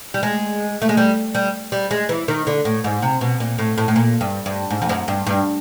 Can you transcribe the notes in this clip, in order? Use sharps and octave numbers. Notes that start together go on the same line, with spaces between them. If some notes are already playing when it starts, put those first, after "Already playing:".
G3
G#3
A3
G#3
G3
G3
G3
G#3
E3
D#3
D3
A2
G#2
C3
B2
A#2
A2
A2
A2
A#2
G2
G2
G#2
F2
F#2
G2
G2